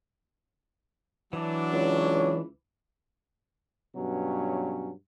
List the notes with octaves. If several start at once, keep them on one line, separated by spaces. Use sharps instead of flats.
E3 F#3 D4
C#2 C#5
G2 B2 F#3 C#4